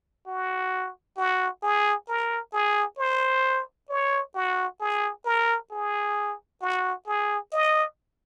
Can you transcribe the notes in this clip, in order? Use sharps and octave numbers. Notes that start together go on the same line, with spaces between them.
F#4
F#4
G#4
A#4
G#4
C5
C#5
F#4
G#4
A#4
G#4
F#4
G#4
D#5